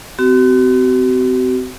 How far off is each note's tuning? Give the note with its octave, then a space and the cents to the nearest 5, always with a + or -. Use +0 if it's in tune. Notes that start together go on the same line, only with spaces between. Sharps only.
C4 -35 F#4 +40